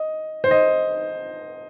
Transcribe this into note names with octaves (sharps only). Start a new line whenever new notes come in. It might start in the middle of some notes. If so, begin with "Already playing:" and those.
Already playing: D#5
C5
D#5